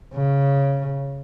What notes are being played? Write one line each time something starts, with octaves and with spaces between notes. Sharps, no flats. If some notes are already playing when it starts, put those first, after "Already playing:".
C#3